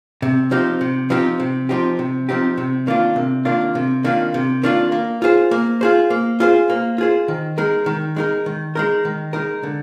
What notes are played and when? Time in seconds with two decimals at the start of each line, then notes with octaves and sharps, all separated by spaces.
0.22 C3
0.51 F3 C4 D#4 G4
0.81 C3
1.10 F3 C4 D#4 G4
1.40 C3
1.69 F3 C4 D#4 G4
1.99 C3
2.29 F3 C4 D#4 G4
2.57 C3
2.87 D#3 A#3 D4 F4
3.16 C3
3.45 D#3 A#3 D4 F4
3.75 C3
4.04 D#3 A#3 D4 F4
4.34 C3
4.63 D#3 A#3 D4 F4
4.92 A#3
5.22 F4 G#4 C5
5.51 A#3
5.81 F4 G#4 C5
6.10 A#3
6.40 F4 G#4 C5
6.70 A#3
6.98 F4 G#4 C5
7.28 D#3
7.58 G#3 D#4 A#4
7.86 D#3
8.16 G#3 D#4 A#4
8.46 D#3
8.75 G#3 D#4 A#4
9.05 D#3
9.33 G#3 D#4 A#4
9.63 D3